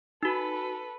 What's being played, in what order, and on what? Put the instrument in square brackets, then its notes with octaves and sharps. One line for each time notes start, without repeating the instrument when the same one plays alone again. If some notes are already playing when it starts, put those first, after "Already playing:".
[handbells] D#4 F#4 [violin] A4 B4